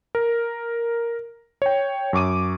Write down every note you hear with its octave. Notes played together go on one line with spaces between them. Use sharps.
A#4
C#5 G5
F#2 C#6 D6 D#7